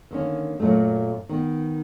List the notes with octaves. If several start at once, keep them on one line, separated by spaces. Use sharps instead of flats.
D3 D#3 A#3 C#4
F#2 A#2 A3
D#3 B3